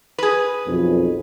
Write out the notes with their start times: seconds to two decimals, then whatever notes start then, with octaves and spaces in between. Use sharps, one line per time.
0.18 G#4 B4
0.67 B1 F2